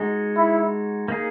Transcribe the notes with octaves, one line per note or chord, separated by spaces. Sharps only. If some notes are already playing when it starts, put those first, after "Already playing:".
Already playing: G#3 D#4 F#4
E4
A#3 D#4 G#4